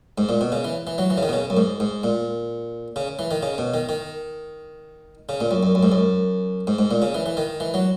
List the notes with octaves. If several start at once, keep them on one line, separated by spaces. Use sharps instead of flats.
G#2
A#2
B2
C#3
E3
E3
F#3
E3
C#3
D#3
B2
C#3
F#2
G#2
G#2
A#2
C#3
E3
D#3
C#3
B2
D#3
D#3
C#3
A#2
F#2
F#2
F#2
G#2
F#2
G#2
G#2
A#2
C#3
E3
E3
D#3
E3
F#3